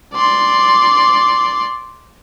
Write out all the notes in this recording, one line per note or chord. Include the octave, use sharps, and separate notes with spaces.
D5 C6